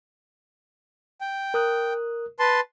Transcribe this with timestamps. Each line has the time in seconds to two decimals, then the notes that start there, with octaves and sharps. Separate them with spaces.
1.21 G5
1.54 A#4 D#6 F#6
2.39 B4 A5 C6